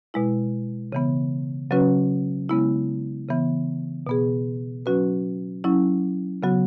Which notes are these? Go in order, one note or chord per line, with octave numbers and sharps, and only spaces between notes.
B2 G#3 E4
C#3 E3 B3
C#3 F#3 C#4 F#4 B4
C#3 G#3 B3 E4
C#3 E3 B3
B2 B3 G#4
F#3 C#4 F#4 B4
F#3 C#4 E4
C#3 F#3 B3 F#4